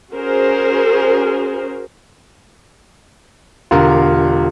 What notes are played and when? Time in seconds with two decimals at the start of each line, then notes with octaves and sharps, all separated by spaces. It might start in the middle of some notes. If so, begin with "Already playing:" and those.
0.11 C#4 F#4 G#4 A#4 C5
3.71 E1 D3 F4 G4 A#4